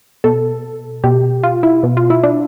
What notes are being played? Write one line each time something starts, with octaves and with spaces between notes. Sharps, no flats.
B2 A4
B2 G4
F4
E4
B2
F4
E4
D4